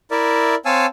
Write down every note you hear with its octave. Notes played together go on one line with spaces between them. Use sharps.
E4 A#4 D5 E5
C4 C#5 F5 G#5 A5 E6